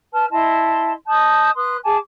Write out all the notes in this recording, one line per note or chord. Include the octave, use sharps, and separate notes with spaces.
B4 A5 F6
E4 D#5 A5 C6
D#5 A5 D#6 G6
B4 C6 D#6 F#6
G#4 G#5 A5 D6